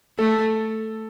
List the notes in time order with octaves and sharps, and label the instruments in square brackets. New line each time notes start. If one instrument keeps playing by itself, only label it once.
[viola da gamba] A3 [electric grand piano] A4